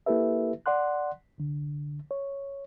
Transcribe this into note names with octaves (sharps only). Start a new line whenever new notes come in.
A#3 E4 G4 A4 B4 E5
D5 F#5 C6 F#6
C2 D3
C#5